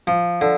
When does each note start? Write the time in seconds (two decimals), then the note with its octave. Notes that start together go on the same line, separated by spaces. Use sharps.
0.07 F3
0.41 D3